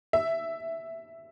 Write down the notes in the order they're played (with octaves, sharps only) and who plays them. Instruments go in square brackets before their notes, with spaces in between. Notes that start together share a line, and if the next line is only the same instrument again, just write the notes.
[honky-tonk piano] E5